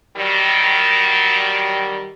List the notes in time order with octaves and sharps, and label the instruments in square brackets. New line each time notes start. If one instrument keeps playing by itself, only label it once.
[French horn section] D#3 F#3 G3